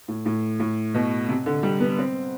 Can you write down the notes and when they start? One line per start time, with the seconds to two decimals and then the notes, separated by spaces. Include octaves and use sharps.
0.08 A2
0.26 A2
0.60 A2
0.94 B2
1.29 C3
1.46 D3
1.63 G3
1.80 B3
1.98 C4